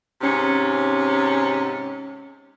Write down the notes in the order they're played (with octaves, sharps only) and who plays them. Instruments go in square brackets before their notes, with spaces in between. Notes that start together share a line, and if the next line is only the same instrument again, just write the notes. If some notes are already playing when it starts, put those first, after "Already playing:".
[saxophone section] G#2 C3 C#4